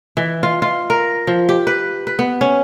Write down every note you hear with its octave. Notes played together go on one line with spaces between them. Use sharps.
E3
F4
F4
A#4
F3
G4
B4
B4
B3
C#4